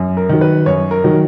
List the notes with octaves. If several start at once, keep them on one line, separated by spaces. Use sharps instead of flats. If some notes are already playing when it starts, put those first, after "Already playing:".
Already playing: F#2
A#4
D#3 F#3
B4
F#2 C#5
A#4
D#3 F#3